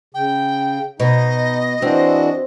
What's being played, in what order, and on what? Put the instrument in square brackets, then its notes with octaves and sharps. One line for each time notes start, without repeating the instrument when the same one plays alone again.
[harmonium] C#3 [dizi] G5
[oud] B2 [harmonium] D#4 [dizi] D#5
[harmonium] E3 D4 F#4 [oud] C4